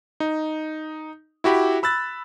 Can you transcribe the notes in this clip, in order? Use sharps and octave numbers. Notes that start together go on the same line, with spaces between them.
D#4
E4 F#4 G4 B5
B5 E6 F#6 A6